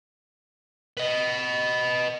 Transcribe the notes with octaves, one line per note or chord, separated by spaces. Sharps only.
B4 D#5